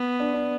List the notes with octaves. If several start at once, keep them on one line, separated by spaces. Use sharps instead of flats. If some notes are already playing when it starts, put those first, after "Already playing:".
Already playing: B3
D4
D4